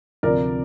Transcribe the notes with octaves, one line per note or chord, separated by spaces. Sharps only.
D2 C3 F3 A#4 D5